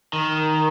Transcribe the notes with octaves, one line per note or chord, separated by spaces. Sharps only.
D#3